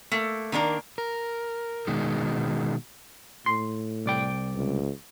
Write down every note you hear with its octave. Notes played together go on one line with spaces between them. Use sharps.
A3 A#3
D#3 A#3 D4 A#4
A#4
B2 D#3 G#3
A2 C6
C2 D5 G5
C#2